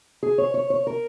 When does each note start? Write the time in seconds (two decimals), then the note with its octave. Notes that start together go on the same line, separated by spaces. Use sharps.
0.23 G#4
0.38 C#5
0.54 C#5
0.70 C#5
0.87 A#4